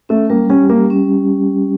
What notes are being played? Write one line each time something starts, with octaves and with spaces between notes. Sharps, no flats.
A3 C#4
G3 A#3
C#4 G4
G3 A#3
C#4